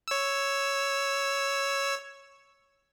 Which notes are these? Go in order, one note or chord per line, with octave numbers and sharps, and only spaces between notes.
C#5 E6